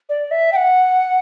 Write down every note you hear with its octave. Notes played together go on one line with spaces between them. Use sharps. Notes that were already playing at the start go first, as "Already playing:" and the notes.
D5
E5
G5
F#5